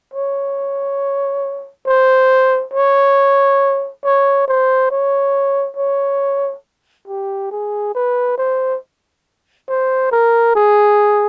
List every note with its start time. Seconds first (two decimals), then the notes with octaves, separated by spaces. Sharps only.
0.14 C#5
1.86 C5
2.73 C#5
4.04 C#5
4.48 C5
4.91 C#5
5.77 C#5
7.07 G4
7.51 G#4
7.95 B4
8.37 C5
9.68 C5
10.12 A#4
10.55 G#4